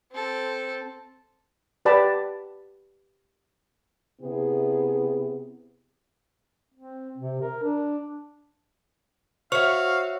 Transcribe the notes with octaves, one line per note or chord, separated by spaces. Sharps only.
C4 A4
G4 B4 D5 A5 B5
C3 B3 E4 G#4
C4
C3
A#4
D4
F#4 C5 C#5 E5 F5 C#6 F6